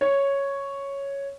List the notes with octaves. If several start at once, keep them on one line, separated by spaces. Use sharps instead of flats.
C#5